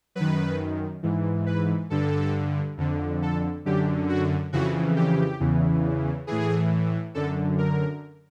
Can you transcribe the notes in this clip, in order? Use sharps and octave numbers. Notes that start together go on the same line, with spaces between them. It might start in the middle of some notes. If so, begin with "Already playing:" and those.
F#2 D#3 B4
G#2 E3
B4
G2 D3 A4
F2 D3
A4
F#2 D3 G4
F#4
F2 C#3 E3 F#4
G4
E2 C#3 E3
A2 E3 G#4
F#2 D3 A4
A#4